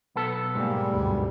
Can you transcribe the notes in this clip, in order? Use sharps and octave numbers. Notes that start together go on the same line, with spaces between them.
B1 B3 A4
G#2 G3 A#3
D2 G2